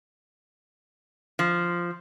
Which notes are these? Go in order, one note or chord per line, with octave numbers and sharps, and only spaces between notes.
F3